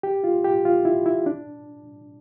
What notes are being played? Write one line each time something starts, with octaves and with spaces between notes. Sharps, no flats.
G4
F4
G4
F4
E4
E4
D4